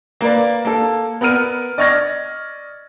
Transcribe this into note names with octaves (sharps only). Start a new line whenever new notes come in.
A#3 A#4 B4 D5
A#3 A4
B3 A#4 F#5 F6 D#7
D5 D#5 C#6 F6 G#6 A#6